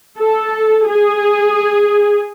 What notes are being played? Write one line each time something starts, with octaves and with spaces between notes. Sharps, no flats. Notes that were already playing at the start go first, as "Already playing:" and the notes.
A4
G#4